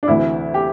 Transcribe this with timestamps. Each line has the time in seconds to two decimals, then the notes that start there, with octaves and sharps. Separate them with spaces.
0.03 D4
0.08 D2 C3 E3 E4
0.54 G4